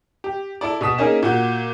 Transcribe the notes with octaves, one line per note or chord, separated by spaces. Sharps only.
G4
E4 A4 D5
B2 D#6 B6 E7
A#3 C#4 D#4 G#4 A#4
A#2 F#4 G6